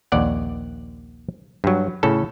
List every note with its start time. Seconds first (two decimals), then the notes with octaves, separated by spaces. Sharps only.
0.12 A#1 D#2 D5 F#5
1.64 G2 F#3
2.03 A2 C#3 C#4 A4